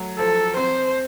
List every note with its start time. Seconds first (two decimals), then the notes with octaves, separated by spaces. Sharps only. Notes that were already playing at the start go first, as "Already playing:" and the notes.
Already playing: F#3 A3
0.19 F3 A4
0.57 C4 C5